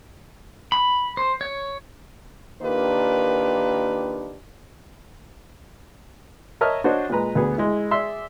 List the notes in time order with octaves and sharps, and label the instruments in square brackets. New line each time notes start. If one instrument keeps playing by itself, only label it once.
[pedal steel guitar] B5
C5
C#5
[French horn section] D#3 A#3 D4 F4 G4 B4
[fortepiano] A#4 C#5 D#5 E5 A5 F6
D4 F#4 C5 C#5 D#5
A#2 G#3 B4 A#5
D2 B3 G#4
G#3 E4
G#4 D5 E5 C6 E6